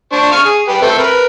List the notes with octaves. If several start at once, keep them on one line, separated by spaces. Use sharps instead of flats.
D4 C5 C#6
F5 C#6 F6
G#4
G4 B4
A3 C4 A4
A#4 B4